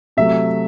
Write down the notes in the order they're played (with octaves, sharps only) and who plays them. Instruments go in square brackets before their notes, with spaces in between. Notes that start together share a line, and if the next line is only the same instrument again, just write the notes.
[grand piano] C3 F#3 A3 E5